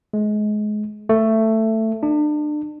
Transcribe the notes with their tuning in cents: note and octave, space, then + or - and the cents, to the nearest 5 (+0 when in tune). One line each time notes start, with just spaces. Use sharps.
G#3 +25
A3 +10
D4 +35